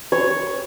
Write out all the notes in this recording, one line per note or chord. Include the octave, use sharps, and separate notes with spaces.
C#5